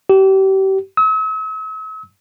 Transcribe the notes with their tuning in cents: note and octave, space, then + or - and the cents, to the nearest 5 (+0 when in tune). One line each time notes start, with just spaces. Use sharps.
G4 -35
E6 -45